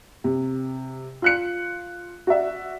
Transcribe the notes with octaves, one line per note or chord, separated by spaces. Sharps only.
C3
F4 F#6 C#7
F#4 D5 E5